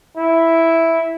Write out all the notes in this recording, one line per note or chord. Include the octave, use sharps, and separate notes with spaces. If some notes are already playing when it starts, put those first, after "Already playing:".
E4